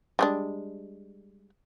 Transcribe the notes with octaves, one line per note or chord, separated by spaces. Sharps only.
G3 G#3 D4